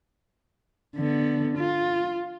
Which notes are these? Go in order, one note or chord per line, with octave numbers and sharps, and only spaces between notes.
D3 B3
F4